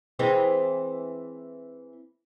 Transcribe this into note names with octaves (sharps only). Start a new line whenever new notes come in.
E3 G#3 C4